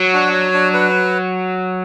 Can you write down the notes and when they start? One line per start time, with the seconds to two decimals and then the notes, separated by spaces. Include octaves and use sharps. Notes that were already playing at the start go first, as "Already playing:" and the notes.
Already playing: F#3 F#4
0.13 D4
0.33 C#5
0.53 D4
0.74 B4